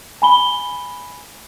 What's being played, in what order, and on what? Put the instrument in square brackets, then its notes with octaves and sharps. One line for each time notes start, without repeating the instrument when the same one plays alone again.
[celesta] G#5 B5 G7